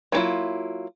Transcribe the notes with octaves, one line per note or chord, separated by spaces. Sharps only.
F#3 A#3 C#4 E4 F4